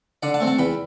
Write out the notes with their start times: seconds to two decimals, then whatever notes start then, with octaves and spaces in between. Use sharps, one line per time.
0.23 D3 D5 F#5
0.34 F#5 A5
0.40 A3 C4
0.47 F#5 A5
0.59 E2 G5 B5